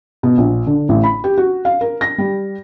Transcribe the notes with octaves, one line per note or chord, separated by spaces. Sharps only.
B2
A#1
D3
A1
B5
G4
F#4
F5
A#4
A#6
G3